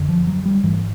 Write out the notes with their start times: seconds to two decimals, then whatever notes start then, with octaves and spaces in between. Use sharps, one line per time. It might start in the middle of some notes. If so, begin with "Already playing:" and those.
Already playing: F#2 D3
0.09 F3
0.27 F#3
0.46 G3
0.64 G#2 E3